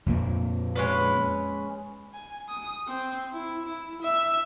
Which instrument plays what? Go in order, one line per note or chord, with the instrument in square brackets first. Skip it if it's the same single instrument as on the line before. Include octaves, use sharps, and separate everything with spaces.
[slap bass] F2 A#2 A#3
[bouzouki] G#3 C#4 B4
[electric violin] G#5
D#6
C4
E4
E4
E5